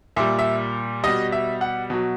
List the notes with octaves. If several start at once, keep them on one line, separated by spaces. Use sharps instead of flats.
A#2 G3 E5
E5
B2 G3 D#5
E5
F#5
B2 F#3